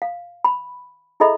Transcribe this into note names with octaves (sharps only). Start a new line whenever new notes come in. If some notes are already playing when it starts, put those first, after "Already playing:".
F5
B5
E4 G#4 A4 D#5 E5 B5